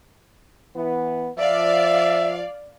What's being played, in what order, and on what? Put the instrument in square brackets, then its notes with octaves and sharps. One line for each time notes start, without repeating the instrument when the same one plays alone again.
[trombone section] E3 B3
[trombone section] F3 [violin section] D5 F5 [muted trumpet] E5